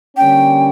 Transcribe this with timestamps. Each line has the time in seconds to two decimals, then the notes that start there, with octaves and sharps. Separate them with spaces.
0.17 D3 G3 A#3 C#4 G5